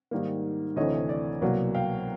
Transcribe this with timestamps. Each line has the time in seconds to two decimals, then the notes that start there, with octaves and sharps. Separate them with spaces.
0.11 G#2 D#3 G3 A#3
0.76 D2 C3 E3 A3 C#5 D#5
1.09 D5
1.41 C2 B2 F#3 A#3 D5
1.74 F5 G5